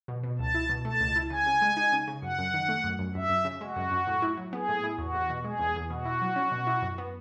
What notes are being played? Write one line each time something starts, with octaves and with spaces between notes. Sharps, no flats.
B2
B2
C#2 A5
E4
B2
A3 A5
C#2
E4
C#3 G#5
C#3
G#3
D#4
C#3
C#3
F#2 F#5
F#2
D#3
A3
F#2
F#2
F#2 E5
F#2
C#3
G#3 F#4
F#2
F#2
A2
E4
F#3
B3 G#4
A2
E4
E2 F#4
E2
B2
G#3 G#4
E2
E2
B2 F#4
E4
F#3
C#4
B2
E4
F#2
B3